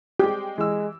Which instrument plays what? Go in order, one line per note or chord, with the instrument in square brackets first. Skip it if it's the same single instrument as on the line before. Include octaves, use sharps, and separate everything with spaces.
[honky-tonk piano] G#3 G5 [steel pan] G4
[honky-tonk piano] E3 E6 [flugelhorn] G#3